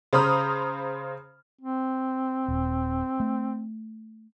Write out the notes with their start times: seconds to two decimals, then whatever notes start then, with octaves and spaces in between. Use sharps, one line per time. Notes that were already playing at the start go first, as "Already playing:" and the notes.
0.13 C#3 C5 A#5 B5 D#6 F6
1.61 C4
2.48 D#1
3.20 A3